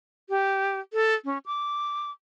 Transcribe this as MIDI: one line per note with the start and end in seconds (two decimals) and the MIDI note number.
0.30 0.79 67
0.93 1.14 69
1.25 1.38 61
1.46 2.11 86